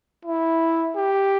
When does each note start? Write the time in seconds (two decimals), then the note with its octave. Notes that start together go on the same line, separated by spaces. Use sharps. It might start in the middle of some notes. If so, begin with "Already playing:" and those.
0.25 E4
0.95 G4